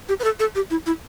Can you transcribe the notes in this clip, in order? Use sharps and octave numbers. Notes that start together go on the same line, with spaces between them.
G4
B4
A4
A4
G4
E4
E4